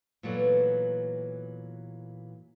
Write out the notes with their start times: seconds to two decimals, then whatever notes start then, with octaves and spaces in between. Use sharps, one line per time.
0.23 A#2 E3 F#3 A3 B3